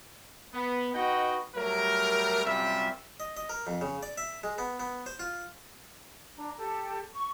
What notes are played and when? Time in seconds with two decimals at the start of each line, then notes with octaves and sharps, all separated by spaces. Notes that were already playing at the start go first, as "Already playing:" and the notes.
0.52 B3
0.93 D#4 F#4 B4 D#5 F#5 G5
1.55 F#3 G3 A3 A#4
2.44 F#2 C3 G3 F4 E5
3.20 D#5
3.37 D#5
3.49 A#4
3.67 F2
3.81 C#3
4.03 D5
4.18 E5
4.44 G#3
4.58 B3
4.80 B3
5.06 C5
5.20 F4
6.37 D4 A#5
6.57 G4 A4
7.13 C#6